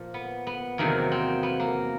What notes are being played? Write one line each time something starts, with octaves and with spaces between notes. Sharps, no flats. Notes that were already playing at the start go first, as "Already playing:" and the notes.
Already playing: A#2 F3
B3
B3
E2 C3 D#3 F#3 A#3
C4
B3
A#3